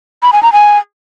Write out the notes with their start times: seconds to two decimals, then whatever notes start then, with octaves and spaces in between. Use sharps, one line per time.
0.23 B5
0.33 G#5
0.43 A#5
0.53 G#5